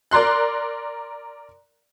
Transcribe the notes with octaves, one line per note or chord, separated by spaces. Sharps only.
A#4 D5 A#5 C6 F#6